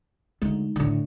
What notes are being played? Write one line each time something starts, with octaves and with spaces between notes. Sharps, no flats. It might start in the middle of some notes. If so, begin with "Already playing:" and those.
D2 G#3 D#4
A2 D3